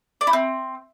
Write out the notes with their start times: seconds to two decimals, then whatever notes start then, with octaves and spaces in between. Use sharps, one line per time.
0.21 D5
0.27 E4
0.33 C4